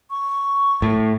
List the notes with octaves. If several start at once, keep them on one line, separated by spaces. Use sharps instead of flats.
C#6
A2